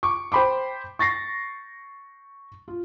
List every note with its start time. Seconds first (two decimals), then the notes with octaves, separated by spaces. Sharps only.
0.03 C#6 D6
0.32 C5 G5 B5 C6 D6
0.99 C#6 A6 A#6 C7
2.68 F4